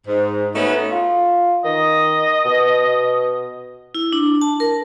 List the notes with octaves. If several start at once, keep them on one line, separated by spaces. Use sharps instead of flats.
G#2
A3 B3 C#4 D#4 F#4 B4
F4
D#3 D#5
B2
E4
D4
A5
A#4